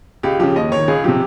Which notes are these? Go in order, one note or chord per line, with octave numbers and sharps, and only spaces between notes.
C#2 G4
C#3 F3 G4
D#2 D#5
D#3 C#5
C#2 G#4
C3 F3 G4